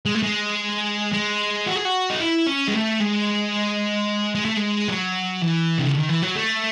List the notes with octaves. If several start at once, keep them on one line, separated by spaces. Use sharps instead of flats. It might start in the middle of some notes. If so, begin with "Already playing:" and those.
G#3
A3
G#3
G#3
F#4
G#4
F#4
D#4
E4
C#4
G#3
A3
G#3
G#3
A3
G#3
F#3
E3
C3
C#3
D#3
E3
F#3
A3